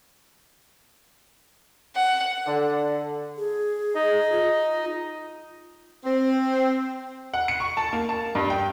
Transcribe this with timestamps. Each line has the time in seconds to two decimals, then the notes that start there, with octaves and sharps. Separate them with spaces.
1.96 F#5
2.46 D3
3.38 G#4
3.95 D#4 D#5
4.32 F4
6.05 C4
7.34 F#5
7.48 C#7
7.60 C#6
7.77 A5
7.93 A#3
8.09 A5
8.35 G2
8.50 G5